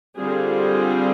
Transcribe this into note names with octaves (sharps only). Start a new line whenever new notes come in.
D3 G3 C4 F4 G#4